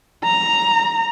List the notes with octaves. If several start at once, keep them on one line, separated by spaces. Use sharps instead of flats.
A#5